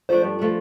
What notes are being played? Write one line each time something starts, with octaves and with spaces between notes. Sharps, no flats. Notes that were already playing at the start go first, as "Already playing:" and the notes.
F3 A3 D4 C5
G2
F3 A3 D4